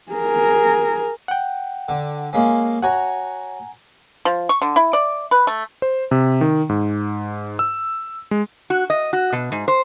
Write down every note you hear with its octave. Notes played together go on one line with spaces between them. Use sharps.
G#4 A#4
F#5 G5
D3
G#3 A#3 C#4
F#4 C#5 F#5 G#5 A#5
F3
C#6
D3
E4
D5
B4
A3
C5
C3
D#3
G#2
E6
G#3
F#4
D#5
F#4
B2
G#2
C5